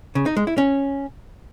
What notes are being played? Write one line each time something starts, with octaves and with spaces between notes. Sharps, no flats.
C#3
D#4
G#3
E4
C#4